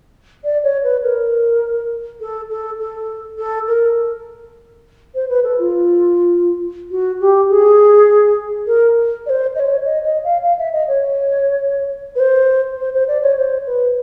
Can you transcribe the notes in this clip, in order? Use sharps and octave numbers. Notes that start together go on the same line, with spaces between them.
D5
C#5
B4
A#4
A4
A4
A4
A4
A#4
C5
B4
A4
F4
F#4
G4
G#4
A#4
D5
C5
D#5
C#5
D#5
D#5
F5
F5
E5
D#5
C#5
B4
C5
C5
C5
D5
C#5
C5
B4